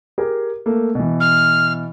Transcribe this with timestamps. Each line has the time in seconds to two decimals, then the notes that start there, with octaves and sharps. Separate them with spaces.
0.18 G4 G#4 A#4
0.66 A3 A#3
0.95 B2 E3
1.20 F6